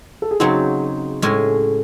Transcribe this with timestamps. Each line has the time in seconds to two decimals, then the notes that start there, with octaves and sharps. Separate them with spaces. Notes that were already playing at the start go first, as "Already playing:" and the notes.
0.22 A4
0.31 G#4
0.40 C#3 F#3 C4 D#4 F#4
1.22 A2 G#3 C#4